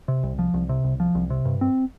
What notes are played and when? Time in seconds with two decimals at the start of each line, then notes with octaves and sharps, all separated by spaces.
0.08 C3
0.23 C2
0.39 F3
0.54 C2
0.69 C3
0.84 C2
1.00 F3
1.15 C2
1.30 C3
1.45 G2
1.61 C4